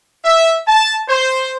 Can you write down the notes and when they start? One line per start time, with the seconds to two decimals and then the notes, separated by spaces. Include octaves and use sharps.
0.24 E5
0.68 A5
1.09 C5